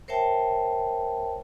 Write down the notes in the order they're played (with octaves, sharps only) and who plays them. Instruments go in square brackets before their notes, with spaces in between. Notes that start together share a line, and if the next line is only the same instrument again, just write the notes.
[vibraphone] A#4 C5 C#5 E5 G5 A5